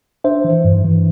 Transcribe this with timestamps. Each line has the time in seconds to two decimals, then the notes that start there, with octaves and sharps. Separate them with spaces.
0.24 D4 C5 E5
0.44 E3
0.64 G2
0.85 E3